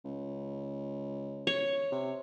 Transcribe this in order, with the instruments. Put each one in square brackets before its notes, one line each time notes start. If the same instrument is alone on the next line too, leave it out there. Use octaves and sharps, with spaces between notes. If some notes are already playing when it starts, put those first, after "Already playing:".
[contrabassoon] C#2
[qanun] C#5
[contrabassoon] C3